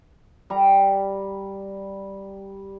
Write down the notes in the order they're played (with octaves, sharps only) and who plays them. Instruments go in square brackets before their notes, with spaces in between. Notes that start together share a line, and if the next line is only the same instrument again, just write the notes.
[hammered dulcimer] G3 A#5